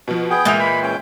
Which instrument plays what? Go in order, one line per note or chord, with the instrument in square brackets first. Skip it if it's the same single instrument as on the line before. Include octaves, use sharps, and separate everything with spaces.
[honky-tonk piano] B2 F3
[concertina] B3 G#4 G5
[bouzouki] A#2 E3 [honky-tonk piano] G#3 G6 F7
[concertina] B5
C#4 G5